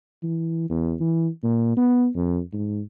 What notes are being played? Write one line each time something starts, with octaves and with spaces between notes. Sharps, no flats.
E3
E2
E3
A#2
B3
F2
G#2